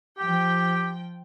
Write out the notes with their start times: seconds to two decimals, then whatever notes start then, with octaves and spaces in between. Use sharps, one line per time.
0.19 F3 G4 G5